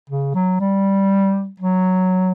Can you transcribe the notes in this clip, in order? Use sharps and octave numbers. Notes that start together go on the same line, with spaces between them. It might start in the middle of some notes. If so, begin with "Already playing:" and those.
C#3
F#3
G3
F#3